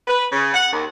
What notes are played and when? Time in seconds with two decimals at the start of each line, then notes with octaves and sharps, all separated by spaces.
0.08 B4
0.32 C#3
0.54 F#5
0.72 D#2